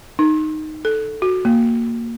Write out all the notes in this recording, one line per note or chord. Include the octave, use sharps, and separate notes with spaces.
D#4
A4
F#4
A#3